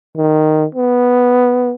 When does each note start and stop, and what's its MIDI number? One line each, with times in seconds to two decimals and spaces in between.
0.17 0.65 51
0.75 1.73 59